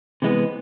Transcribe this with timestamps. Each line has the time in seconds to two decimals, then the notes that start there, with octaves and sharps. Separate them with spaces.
0.22 C3 E3 G#3 B3